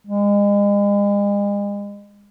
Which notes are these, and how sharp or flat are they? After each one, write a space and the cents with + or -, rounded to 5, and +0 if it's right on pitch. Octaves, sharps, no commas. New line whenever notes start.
G#3 -40